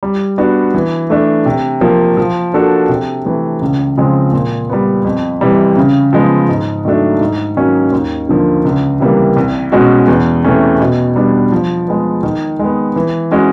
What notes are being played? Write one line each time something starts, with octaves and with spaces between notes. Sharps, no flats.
G3
B3 D4 F#4
E3
A3 D4
C3
F3 A#3
F3
A#3 D4 F#4 A4
C3
E3 A3
C#2
C#3 F3 G#3 C4
A#2
G3 B3
F2
C3 E3 G3
C#3
F3 G#3 B3
G#2
D#3 F#3 A3 D4
G#2
D#3 F#3 A#3 C#4
D#2
D3 F3 A#3
C#2
C3 E3 G3 A#3
C2
B2 G#3 C#4 F#4
E2
C3 E3 A3 C#4
B2
G3 B3 D4
F3
G#3 B3
D#3
G#3
B3
E3
G#3 C#4 F#4